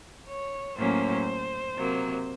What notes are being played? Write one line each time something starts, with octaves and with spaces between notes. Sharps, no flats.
C#5
A2 F#3 A#3 C#4 C5
C3 F#3 A#3